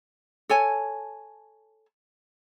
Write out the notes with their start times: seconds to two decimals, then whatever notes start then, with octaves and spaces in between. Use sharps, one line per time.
0.49 A4 C#5 G#5 A5